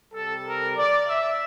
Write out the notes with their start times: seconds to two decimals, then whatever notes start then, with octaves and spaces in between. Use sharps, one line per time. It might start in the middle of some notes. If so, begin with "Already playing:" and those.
0.13 C3 G3 A4
0.45 A#4
0.77 D5
1.07 E5